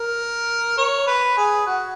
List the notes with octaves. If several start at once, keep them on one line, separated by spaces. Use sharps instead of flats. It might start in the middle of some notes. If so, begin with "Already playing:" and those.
Already playing: A#4
C#5
B4
G#4
F#4